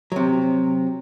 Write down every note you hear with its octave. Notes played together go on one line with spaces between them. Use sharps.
C3 F#3